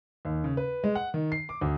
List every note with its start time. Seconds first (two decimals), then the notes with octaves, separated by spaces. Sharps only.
0.25 D#2
0.44 C#3
0.57 B4
0.84 G#3
0.95 F#5
1.14 D#3
1.32 C7
1.49 D6
1.61 D2